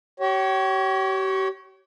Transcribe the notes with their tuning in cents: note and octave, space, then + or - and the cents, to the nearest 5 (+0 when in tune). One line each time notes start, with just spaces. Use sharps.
G4 -40 C#5 +0